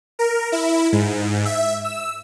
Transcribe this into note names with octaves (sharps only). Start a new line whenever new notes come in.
A#4
E4
G#2
E5
E6